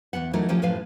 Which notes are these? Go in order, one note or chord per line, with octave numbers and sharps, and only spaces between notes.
E2 C#3 B3 F#5
E3 F#3 A3 D#4 A#4
D#2 F3 C#4 G4 G5
F#2 A2 F3 B4 F5